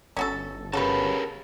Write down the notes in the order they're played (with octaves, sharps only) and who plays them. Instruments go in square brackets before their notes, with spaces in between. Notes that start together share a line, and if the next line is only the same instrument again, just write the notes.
[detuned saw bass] G1 [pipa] C#4 F#4 A4
[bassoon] C#3 [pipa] F#4 B4 [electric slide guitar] G4 A#4 A5